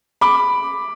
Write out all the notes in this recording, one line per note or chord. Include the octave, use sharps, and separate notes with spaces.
B5 D6